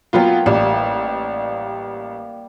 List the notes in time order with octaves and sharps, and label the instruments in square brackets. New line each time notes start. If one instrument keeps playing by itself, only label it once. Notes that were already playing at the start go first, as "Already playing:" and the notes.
[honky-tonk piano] F#3 B3 F4 [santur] A#3 G5
[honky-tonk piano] A1 [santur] G3